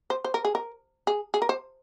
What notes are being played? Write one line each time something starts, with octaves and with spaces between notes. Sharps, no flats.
C5
C5
A#4
G#4
A#4
G#4
G#4
A#4
C5